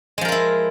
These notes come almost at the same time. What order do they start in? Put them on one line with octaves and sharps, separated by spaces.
G#3 F3 A#4 F4 E4